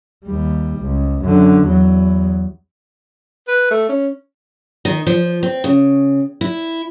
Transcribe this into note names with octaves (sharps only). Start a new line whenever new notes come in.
D#2 G3
C#2
F#2 D3
E2 F#3
B4
A3
C#4
D#3
F3
C4
C#3
E4